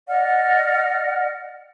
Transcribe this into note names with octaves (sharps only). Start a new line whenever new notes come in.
D5 D#5 F#5 F6